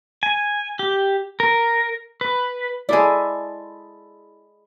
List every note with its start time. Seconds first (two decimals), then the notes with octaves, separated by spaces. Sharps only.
0.23 G#5
0.79 G4
1.40 A#4
2.21 B4
2.89 G#3 E4 G#4 A4 D5